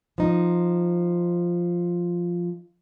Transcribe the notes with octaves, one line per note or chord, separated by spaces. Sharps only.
F3 D#4